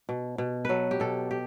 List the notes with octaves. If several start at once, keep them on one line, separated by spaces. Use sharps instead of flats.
B2
B2
F#3 A4 B4
G4
B2 A4
G4